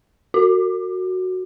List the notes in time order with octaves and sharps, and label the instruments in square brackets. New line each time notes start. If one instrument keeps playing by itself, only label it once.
[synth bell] F#4